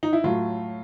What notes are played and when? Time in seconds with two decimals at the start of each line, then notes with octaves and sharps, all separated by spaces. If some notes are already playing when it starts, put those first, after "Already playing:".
0.03 D#4
0.13 E4
0.24 A2 F#3 A3 F4